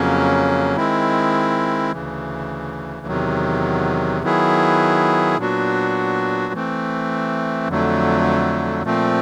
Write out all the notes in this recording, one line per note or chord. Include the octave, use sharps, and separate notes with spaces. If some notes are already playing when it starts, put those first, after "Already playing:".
Already playing: F2 C#3 F#3 A#3 C#4
D#3 G#3 C4 E4
D2 C#3 E3
E2 C3 D#3 F#3
D#3 F#3 B3 E4 G#4
A#2 F#3 B3 D4 F#4
E3 A3 C4
F2 D3 F#3 A3
A#2 F3 A3 C4